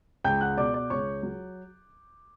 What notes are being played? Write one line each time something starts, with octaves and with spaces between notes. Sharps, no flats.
C#2 G5 G6
F#5 F#6
B2 D5 D6
D5 D6
C#2 C#5 C#6
F#3